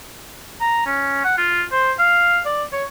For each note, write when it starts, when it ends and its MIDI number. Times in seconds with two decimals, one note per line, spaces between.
0.61 0.83 82
0.86 1.22 61
1.24 1.37 78
1.37 1.63 65
1.72 1.92 72
1.99 2.40 77
2.45 2.63 74
2.73 2.83 73